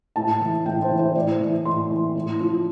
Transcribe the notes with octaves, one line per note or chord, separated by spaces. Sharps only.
A2 A5
E3
A2 G5
C5
E3
C5
A2 D5
E3
A2 C6
E3
A2
F3